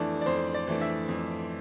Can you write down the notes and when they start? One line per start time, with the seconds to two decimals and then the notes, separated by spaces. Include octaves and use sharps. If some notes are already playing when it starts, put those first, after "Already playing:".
Already playing: F2 E3 A3 D4
0.21 D5
0.26 F2 C5
0.54 D5
0.67 E3 A3 D4
0.81 E5
1.09 F2